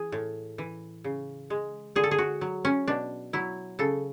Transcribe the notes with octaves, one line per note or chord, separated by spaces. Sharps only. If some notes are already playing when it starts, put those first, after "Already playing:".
Already playing: E3 G#4
A2
E3
C#3
G#3
D3 G#4
A4
G#4
F#4
F#3
C#4
B2 D4
F#3 E4
C#3 A4